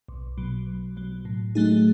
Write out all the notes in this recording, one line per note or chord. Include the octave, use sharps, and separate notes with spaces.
B1
B2 F#3
B1
B2 F#3
A2
F#3 A3 D#4 G#4